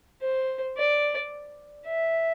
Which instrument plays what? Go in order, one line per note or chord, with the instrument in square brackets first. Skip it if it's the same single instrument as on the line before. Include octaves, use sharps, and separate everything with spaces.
[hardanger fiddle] C5
D5
E5